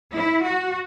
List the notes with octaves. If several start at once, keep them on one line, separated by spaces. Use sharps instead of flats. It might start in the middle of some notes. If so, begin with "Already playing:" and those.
E4
F#4